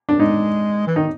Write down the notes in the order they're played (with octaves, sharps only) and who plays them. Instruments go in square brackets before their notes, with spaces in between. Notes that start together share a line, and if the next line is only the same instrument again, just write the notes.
[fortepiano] D4
[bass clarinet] G#3 [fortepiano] D#4
[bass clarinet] E3
[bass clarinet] D#3 [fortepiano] D#4